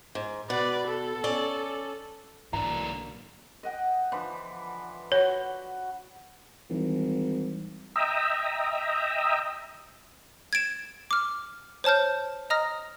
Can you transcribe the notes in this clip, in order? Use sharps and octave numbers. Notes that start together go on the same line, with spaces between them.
G#2
B2 B4 D5
A4
C#4 D5
B1 G#2 D3 E3 A#3 D4 A#5
D#5 F#5 G5
D3 E3 F3
F#4 B4 C#5
G#1 D#2 E3 G3
D#5 E5 G5 A#5 D#6 E6
G#6 A6 D7 E7
D6 F6
C5 C#5 A5 F6 G6
D#5 A#5 D#6 F6 A#6